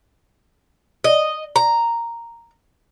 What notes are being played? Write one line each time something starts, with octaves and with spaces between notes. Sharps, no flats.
D#5
A#5